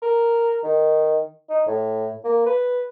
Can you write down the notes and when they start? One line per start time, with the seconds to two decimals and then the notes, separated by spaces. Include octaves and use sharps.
0.02 A#4
0.63 D#3
1.50 D#4
1.67 A2
2.24 A#3
2.46 B4